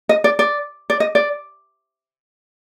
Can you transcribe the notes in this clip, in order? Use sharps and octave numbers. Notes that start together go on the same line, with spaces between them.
D#5
D5
D5
D5
D#5
D5